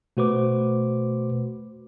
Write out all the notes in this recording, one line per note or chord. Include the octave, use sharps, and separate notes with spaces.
B2 A3 F#4 B4 C5 D6